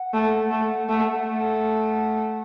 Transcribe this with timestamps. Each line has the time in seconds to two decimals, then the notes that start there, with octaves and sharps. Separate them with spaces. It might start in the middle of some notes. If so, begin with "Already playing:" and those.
Already playing: F#5
0.13 A3
0.51 A3
0.89 A3
1.27 A3 F#5